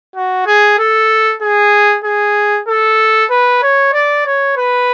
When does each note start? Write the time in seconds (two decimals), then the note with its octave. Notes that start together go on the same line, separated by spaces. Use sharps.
0.15 F#4
0.46 G#4
0.79 A4
1.42 G#4
2.04 G#4
2.68 A4
3.30 B4
3.62 C#5
3.93 D5
4.26 C#5
4.57 B4